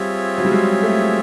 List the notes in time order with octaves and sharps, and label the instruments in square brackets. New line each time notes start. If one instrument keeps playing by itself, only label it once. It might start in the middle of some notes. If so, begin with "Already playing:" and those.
Already playing: [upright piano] G3 [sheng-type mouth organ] C4 F4 G#4 C#5 E5
[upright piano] F#3
G3
G#3
A3